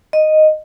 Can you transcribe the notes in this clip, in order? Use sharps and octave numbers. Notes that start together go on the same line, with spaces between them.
D#5